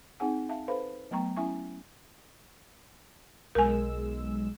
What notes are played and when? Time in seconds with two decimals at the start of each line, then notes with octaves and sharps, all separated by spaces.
0.20 C4 D#4 G#4 F#5 G#5
0.49 E5 F5 A5
0.68 A4 B4 C5 F5 B5
1.11 F#3 A3 B3 G5 A#5 C#6
1.37 C#4 E4 E5 G#5 C#6
3.55 B1 G#3 A#4 G#5 E6